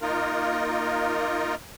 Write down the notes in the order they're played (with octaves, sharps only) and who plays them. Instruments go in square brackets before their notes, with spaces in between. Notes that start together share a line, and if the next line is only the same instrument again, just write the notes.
[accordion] A#3 D#4 F4 A#4